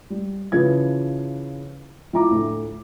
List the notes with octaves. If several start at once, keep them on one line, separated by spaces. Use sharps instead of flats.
G3
C#3 E3 F3 B4 G#6
F3 E4 A#5 D6
D2 A2